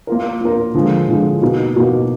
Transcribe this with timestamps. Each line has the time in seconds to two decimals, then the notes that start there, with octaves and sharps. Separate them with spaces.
0.07 A#3 F4 A#4
0.41 A#3 F4 A#4
0.74 D3 F3 G#3
1.09 D3 F3 G#3
1.42 B2 A#3 D#4
1.75 B2 A#3 D#4